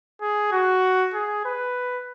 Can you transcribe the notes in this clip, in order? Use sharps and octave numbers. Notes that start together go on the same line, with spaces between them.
G#4
F#4
G#4
B4